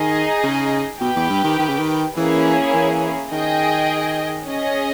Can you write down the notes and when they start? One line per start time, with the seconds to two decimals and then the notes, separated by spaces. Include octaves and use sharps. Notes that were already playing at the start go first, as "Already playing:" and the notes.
Already playing: D#3 D#4 G#4 D#5
0.43 C#3
1.01 B2 G4 B4 G5
1.16 E2
1.30 G2
1.44 D#3
1.59 D#3
1.69 C#3
1.78 D#3
2.16 E3 A#3 C#4 E4 G#4
2.74 E3
3.32 D#3 G#4 D#5 G5
4.47 C#4 G#4 D#5